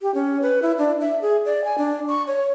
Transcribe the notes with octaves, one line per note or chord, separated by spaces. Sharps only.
G4
C#4
B4
E4
D4
E5
G#4
D5
G#5
D4
C#6
C#5